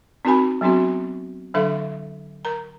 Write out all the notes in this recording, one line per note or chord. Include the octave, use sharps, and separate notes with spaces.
C4 D#4 F#4 A#4 G#5 B5
F#3 B3 C4 D4 F#4
D3 F#3 D4 A4 E5 F5
A#4 A#5